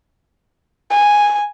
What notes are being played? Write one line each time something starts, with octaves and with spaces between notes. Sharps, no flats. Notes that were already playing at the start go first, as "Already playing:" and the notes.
G#5